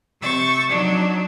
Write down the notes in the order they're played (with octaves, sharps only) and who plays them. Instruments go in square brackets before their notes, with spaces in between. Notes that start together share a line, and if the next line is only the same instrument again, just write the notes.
[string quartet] C3 C#6 E6 G6 A6
F#3 D4 D#4